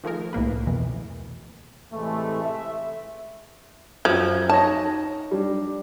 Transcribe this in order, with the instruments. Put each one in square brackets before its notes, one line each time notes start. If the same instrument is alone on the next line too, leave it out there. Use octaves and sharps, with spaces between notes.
[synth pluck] D#3 F3 A3 G#4 A#4
C2 A2 A#3 B4
F2 B2 E3
[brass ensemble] A2 C3 E3 G#3 A3
E5
[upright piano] F#2 G#6 [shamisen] F3
[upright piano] D#4 C#5 A#6 [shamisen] A5
[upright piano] G3 D4